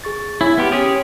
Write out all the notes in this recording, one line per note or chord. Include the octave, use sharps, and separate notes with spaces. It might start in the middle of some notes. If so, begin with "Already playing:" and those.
G#4 C#6 A6
E4 C#5 G#5 B5
B3 G4 C6 F6
C#4 G4 G#4